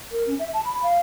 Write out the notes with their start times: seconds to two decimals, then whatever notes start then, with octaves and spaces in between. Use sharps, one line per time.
0.12 A#4
0.27 C#4
0.39 E5
0.54 A5
0.65 B5
0.83 F5